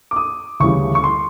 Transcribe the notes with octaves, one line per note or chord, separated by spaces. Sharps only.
D6
D#6
D2 C#3 E3 G3 C#6
C#6
C6